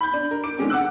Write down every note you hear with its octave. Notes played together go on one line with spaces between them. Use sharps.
B5 G6
D4
A#4
D6 D7
D3 D#3 G#3 C4 C#4
F#5 D6 E6 F#6